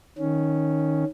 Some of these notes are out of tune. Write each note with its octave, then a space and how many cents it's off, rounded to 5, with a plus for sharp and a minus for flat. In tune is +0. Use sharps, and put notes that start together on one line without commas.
D#3 +0 C#4 +0